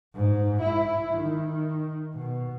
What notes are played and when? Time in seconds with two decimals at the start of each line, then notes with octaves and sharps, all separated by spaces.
0.14 G#2
0.61 E4
1.18 D#3
2.14 B2